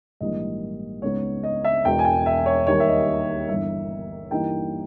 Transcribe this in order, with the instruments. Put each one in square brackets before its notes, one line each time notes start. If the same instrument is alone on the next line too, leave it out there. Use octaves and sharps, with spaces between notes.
[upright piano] A#1 G#2 E3 G3 A#3 D#5
C#2 C#3 G#3 B3 D#4 C#5
D#5
E5
E1 E2 B2 G5
G#5
G5
E5
C#5
D#2 D#3 G3 A#3 C#5
E5
D#5
G1 G2 E3 E5
G2 E3 G3 A#3 D#4 G5